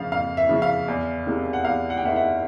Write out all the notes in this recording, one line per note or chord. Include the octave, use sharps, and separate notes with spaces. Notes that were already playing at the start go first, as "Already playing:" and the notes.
Already playing: F2 C#3 F3 F5
F2 F5
E5
C#3 F3
F5
E2
C3 D#3 G#3
F#5
E2 F5
F#5
G5
C3 D#3 G#3 E5 F#5
E5 F#5